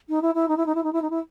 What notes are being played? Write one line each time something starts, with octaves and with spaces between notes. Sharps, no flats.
D#4
E4
E4
D#4
E4
D#4
E4
D#4
E4
D#4
E4